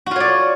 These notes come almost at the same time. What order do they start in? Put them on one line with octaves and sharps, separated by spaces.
F#4 F4 C#5 D5